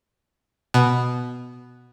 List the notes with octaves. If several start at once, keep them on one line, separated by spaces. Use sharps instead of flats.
B2